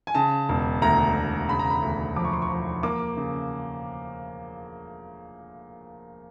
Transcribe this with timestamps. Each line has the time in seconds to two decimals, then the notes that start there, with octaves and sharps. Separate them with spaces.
0.07 G#5
0.15 C#3 A5
0.49 E1
0.82 D2 A#5
1.16 E1
1.49 C#3 B5
1.59 A#5
1.70 B5
1.82 D2
2.16 F3 D6
2.25 C#6
2.33 C6
2.42 C#6
2.50 F3
2.83 A#3 D6
3.17 C#3